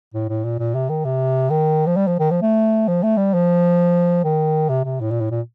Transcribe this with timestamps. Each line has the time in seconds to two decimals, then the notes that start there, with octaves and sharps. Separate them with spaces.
0.14 A2
0.29 A2
0.44 A#2
0.59 A#2
0.75 C3
0.89 D#3
1.05 C3
1.50 D#3
1.87 F3
1.96 G3
2.07 F3
2.19 D#3
2.31 F3
2.42 A3
2.88 F3
3.03 A3
3.17 G3
3.34 F3
4.24 D#3
4.69 C3
4.84 C3
5.01 A2
5.11 A#2
5.21 A2
5.31 A#2